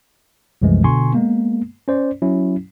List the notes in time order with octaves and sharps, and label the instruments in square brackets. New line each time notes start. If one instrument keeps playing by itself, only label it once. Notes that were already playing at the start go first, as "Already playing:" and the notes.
[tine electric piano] C2 F#2 E3 F3 G#3 A3
B2 D3 G#5 C6 C#6
G#3 A#3 B3
C#4 C5 D5
F#3 C#4 E4